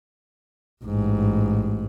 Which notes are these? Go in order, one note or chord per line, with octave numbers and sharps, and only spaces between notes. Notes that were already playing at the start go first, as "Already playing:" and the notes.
A1 G#2